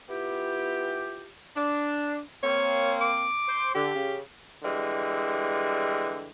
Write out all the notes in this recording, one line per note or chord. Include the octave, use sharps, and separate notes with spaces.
B3 E4 F4 G4
D4
A#3 C4 C#5
D6
C5
D3 G4
C#3
D3 E3 G3 G#3